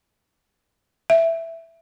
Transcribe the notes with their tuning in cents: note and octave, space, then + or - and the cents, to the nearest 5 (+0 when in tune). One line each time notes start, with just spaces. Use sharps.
E5 +5